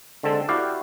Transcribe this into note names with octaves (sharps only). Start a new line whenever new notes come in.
D3 G#3 C4 A4
E4 F#4 G4 D5 F5